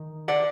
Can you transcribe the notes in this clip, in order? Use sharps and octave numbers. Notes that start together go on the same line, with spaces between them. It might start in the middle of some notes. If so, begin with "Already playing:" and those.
Already playing: D#3
D5 F#5